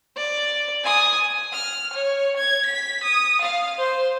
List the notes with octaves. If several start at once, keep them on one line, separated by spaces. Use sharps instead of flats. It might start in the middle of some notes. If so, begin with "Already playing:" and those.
D5
G#5 D#6
F6
C#5
G#6
B6
D#6
F5
C5